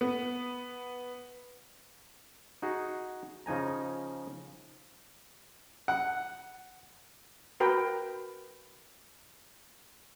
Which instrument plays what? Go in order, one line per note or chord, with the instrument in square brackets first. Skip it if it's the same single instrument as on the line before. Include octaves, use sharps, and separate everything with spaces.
[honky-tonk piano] B3
[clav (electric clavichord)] D#4 F#4 G#4
C#3 F3 D#4 G#5 A#5
[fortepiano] F#5
[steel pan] F#4 A#4 B4 G5